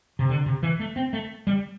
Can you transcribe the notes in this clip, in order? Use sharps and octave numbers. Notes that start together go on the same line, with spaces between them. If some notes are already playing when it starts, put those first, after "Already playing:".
C3
D3
C3
E3
A3
C4
A3
G3